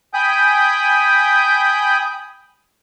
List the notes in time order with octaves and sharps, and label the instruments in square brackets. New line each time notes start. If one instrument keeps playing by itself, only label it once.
[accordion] G5 G#5 B5 D#6 G6